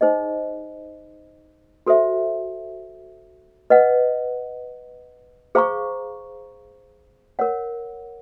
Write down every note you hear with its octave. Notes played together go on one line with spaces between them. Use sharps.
D#4 G#4 C5 D#5
F#4 A4 C5 E5
B4 D#5 F#5
G#4 C5 F5 A#5 C#6
A#4 C#5 F#5